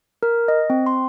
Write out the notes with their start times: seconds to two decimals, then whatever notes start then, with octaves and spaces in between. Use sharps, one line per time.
0.23 A#4
0.48 D#5
0.70 C4
0.86 C6